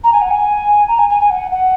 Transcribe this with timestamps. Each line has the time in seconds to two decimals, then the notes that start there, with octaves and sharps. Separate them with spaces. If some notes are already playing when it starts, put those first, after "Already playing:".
0.04 A#5
0.13 G#5
0.22 F#5
0.31 G#5
0.88 A#5
0.99 G#5
1.10 G#5
1.20 G#5
1.30 F#5
1.52 F#5